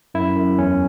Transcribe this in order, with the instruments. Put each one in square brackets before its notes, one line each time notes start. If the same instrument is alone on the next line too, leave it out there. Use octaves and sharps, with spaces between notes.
[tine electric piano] F#2 E4
F#2
E2 C#4